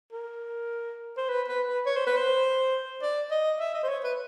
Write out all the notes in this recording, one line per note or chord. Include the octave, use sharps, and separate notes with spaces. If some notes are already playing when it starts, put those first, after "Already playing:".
A#4
C5
B4
B4
B4
C#5
C5
B4
C5
D5
D#5
E5
D#5
C5
C#5
B4